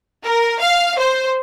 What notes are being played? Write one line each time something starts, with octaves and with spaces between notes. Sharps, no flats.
A#4
F5
C5